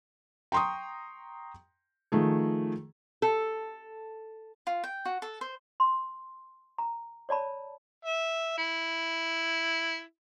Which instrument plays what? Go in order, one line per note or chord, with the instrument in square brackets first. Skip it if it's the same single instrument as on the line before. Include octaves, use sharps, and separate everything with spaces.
[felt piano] G5 A#5 C6 C#6 D#6
D#3 F3 A3 G#4
[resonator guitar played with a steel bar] A4
[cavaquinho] F4
G5
F#4
A4
C5
[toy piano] C6
A#5
C#5 D5 A5 B5
[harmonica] E5
E4